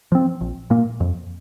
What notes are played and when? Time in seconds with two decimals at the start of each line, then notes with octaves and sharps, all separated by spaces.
0.12 F3 C4
0.41 A#1
0.70 A#2 A#3
1.00 F2